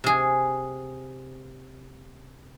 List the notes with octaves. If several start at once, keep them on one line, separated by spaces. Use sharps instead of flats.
C3 G#4